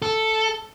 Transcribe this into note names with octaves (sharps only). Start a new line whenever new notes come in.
A4